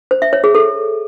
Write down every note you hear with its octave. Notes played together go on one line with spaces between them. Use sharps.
C5
E5
C#5
G#4
A4